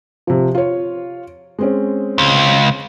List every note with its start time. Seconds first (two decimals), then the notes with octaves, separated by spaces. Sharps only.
0.27 C3 F3
0.55 F4 C#5
1.59 G#3 C4 C#4
2.18 C#2